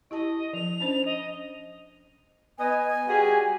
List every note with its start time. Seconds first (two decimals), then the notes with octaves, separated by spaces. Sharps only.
0.11 E4 G4 D#5 A5
0.53 F3 F7
0.80 C#4 D4 C5
1.06 D#5
2.58 B3 D#5 G#5
3.07 G3 F#4 G#4